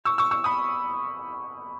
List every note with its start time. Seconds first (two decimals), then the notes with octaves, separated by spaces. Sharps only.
0.05 C#6 E6
0.18 C#6 E6
0.31 C#6 E6
0.44 B5 D#6